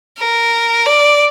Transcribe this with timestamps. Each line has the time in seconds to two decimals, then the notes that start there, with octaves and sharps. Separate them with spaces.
0.19 A#4
0.86 D5